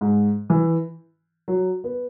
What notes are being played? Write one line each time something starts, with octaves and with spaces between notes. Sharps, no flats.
G#2
E3
F#3
B3